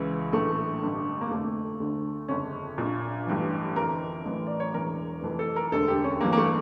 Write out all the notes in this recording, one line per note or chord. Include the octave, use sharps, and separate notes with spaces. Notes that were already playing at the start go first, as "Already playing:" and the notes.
Already playing: C#2 C#3 E3 E4
A#1 A2 E3 A3
A1 G2 D3
A#3
F1 F2 D3 A3
D2 D3
G1 F2 C#3 C#4
A#1 A#2
A1 G2 E3
G1 F2 E3 A#4
A1 A2 E3
D5
C#5
E1 E2 E3 A#4
F1 F2 E3
A4
A#4
E1 D2 D3 A4
G4
C#4
A1 G2 E3 A#3
A#3
A3